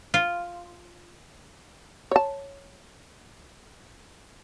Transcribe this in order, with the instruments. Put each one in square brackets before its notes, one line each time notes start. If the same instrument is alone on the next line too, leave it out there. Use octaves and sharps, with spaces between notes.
[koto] F4
[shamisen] C#5 A5